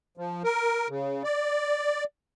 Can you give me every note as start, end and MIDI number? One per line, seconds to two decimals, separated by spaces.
0.17 0.42 53
0.44 0.88 70
0.89 1.23 49
1.24 2.04 74